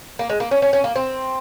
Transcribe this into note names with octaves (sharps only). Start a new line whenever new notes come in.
A#3
G#3
A#3
C#4
C#4
C#4
A#3
C4